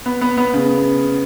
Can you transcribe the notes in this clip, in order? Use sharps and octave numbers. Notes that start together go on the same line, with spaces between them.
B3
B3
B3
C#3